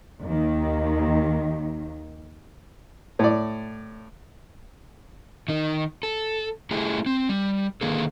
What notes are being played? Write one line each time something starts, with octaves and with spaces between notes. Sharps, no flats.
D#2 D#3
A2 D5
D#3 D#4
A4
A3 E4 G4 G#4
C4
G3
D3 D#3 A#3 G#4 A4